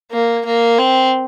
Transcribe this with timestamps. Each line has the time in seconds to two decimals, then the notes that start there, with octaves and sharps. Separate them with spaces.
0.12 A#3
0.45 A#3
0.78 C4